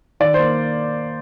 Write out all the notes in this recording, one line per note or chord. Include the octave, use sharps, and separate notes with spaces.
D#3 D5
A#3 C5